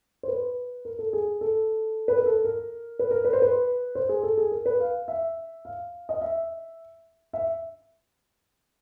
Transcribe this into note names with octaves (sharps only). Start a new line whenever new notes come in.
C5
B4
A#4
A4
G#4
A4
B4
A#4
A4
A#4
B4
A#4
B4
C5
B4
C5
G#4
A4
G#4
A#4
B4
F5
E5
F5
D#5
E5
E5